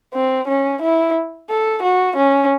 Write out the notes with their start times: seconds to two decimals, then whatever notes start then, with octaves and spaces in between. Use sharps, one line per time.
0.14 C4
0.48 C#4
0.82 E4
1.50 A4
1.83 F#4
2.16 C#4